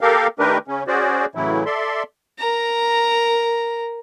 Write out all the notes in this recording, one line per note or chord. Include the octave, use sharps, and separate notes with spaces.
A#3 G4 A4 A#4 F5
D#3 A3 D4 G4 A#4 B4
C#3 C#4
C#4 F#4 G#4 C5 D5
A2 C#3 E3 F#3 A3 E4
A4 D5 E5 C6
A#4 A#5